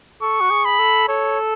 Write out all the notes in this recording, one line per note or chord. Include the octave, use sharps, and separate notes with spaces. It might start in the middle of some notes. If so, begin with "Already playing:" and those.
A4 C#6
F#4
G#4
B5
A4
A4 C#5